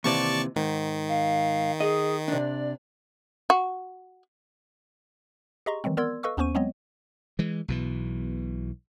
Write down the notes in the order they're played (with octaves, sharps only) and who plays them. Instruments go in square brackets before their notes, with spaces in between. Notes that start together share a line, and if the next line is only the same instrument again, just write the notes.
[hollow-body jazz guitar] D#2 C3 E3 [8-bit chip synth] D5 A5 C#6
[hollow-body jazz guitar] G#2 [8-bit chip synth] D#3
[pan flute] F5
[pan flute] G#4 [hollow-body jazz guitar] D#5
[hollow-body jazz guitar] C3 D4 [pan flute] D5
[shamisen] F#4
[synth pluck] G4 G#4 D#5 A#5 C6 C#6
D#3 E3 F#3 G#3 C4
B3 A#4 D5 C6 E6 G#6
A4 B4 D#5 F5 C#6 E6
D#2 B3 C#4 C5 C#6 D#7
F#3 G#3 B3 C4 C#5 D#5
[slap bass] E3 G#3
B1 B2 E3